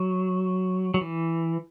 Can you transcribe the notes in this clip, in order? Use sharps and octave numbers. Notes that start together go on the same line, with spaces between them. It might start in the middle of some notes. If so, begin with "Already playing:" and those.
Already playing: F#3
F#3
E3